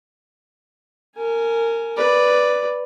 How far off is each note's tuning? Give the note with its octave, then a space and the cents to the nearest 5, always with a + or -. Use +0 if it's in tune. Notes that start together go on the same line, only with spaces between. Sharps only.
A#4 -20 G#5 +10
B4 +0 D5 +0